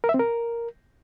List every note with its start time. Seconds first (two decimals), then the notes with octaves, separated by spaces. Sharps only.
0.04 A#4
0.09 E5
0.14 C4
0.19 A#4